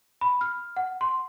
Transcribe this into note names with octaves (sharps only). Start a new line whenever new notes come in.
B5
F6
F#5
C6